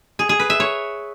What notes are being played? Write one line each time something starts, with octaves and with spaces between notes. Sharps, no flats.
G#4
G#4
B4
E5
C#5